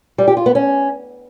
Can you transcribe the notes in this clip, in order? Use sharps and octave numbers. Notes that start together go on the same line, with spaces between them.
G3
G4
F4
B3
C#4